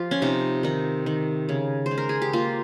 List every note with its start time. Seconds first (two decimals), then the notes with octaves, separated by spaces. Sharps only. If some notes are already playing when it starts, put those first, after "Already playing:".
Already playing: F3 F4 G4
0.11 C#4
0.22 C3 D#4
0.63 D#3 D#4
1.06 D#3
1.49 C#3
1.86 C5
1.91 G#3
1.98 A#4
2.09 G#4
2.22 G4
2.33 A#3 F4